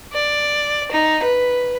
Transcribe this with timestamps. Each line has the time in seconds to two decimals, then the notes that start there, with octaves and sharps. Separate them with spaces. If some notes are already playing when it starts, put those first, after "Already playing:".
0.13 D5
0.92 D#4
1.23 B4